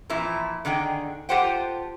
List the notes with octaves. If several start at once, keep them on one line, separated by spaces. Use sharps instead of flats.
A#2 E3 F3 E4
D3 D#3 G#4 G5
F4 G4 A4 C5 F#5 G5